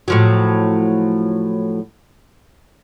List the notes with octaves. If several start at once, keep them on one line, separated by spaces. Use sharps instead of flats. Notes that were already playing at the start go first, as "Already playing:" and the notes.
A2 F3 F#3